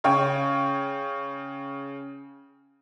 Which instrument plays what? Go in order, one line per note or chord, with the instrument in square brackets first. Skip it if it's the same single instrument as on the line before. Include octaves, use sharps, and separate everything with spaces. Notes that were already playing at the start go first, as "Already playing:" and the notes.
[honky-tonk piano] C#3 C#5 G5